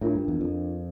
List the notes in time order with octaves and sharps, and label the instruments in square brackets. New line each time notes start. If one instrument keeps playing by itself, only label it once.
[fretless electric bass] A2 [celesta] D4 F4 A#4
[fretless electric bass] G2
E2
F2